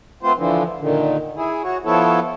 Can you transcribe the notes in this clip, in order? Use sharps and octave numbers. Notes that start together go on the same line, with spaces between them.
A3 B3 C4 F4 C5
D3 E3 F3
A#2 D3 D#3
E4 G#4
F#4 C#5
F3 B3 E4 A4 C#5